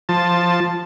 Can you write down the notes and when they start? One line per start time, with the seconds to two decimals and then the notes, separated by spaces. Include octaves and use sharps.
0.09 F3 A5